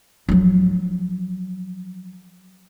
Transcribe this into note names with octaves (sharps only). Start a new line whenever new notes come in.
F3 F#3